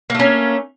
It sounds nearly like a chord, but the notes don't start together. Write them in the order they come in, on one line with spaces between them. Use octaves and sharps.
A#3 A3 C#4